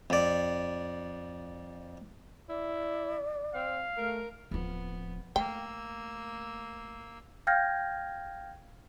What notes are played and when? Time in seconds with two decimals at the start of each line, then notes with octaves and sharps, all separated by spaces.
0.10 F2 D5
2.49 E4 D5
3.54 C4 F5
3.97 A3 A#4
4.51 D1 F3 B3
5.36 A3 A#3 G5 E6
7.47 F5 G5 F6 G6 G#6 A#6